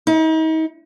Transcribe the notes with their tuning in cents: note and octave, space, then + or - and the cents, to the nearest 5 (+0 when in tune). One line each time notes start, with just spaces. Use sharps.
D#4 +40